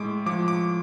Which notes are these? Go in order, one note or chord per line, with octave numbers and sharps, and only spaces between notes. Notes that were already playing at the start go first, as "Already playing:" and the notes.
Already playing: A2 G#3 D6
F3 D6
D6